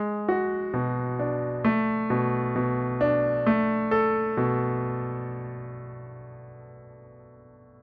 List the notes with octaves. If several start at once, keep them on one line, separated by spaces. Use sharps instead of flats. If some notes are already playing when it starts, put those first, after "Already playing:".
Already playing: G#3
F#4
B2
D4
A3
B2
B2
D4
A3
A4
B2